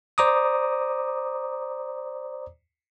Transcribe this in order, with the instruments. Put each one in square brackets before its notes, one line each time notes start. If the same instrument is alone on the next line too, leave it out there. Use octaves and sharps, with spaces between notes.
[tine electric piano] C5 D5 A#5 D6 D#6